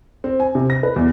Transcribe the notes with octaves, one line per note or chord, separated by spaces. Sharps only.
C4
G#5
C3
A#6
B4
E2